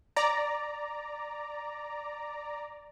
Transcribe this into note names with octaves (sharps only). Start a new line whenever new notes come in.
D5 A#5